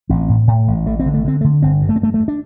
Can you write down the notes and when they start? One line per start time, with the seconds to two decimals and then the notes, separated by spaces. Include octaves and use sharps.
0.09 A1 C4
0.29 A2
0.47 A2
0.68 A1
0.86 A1 A3
1.00 C4
1.06 D3
1.14 A3
1.24 D3 C4
1.41 A3
1.44 D3
1.62 G1 C4
1.82 G2
1.89 A3
1.96 C4
2.01 G2 A3
2.14 A3
2.20 G2
2.28 D4